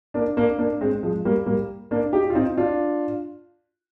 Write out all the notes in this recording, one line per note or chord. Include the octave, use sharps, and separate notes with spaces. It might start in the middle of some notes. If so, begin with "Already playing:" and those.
A#3 D4
A#3 D4
A#3 D4
G#3 C4
F3 G#3
G3 A#3
G3 A#3
A#3 D4
D#4 G4
F4
C4 D#4
D4 F4